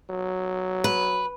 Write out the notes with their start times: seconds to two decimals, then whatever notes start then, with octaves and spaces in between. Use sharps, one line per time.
0.10 F#3
0.84 B4